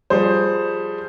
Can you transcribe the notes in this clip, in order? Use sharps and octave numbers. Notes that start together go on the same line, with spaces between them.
F3 G3 G#4 C5